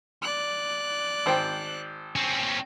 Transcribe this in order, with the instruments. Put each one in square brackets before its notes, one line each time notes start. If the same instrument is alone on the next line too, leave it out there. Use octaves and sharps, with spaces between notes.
[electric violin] D5 F#6
[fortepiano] G#1 C5 G5
[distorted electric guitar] C4 C#4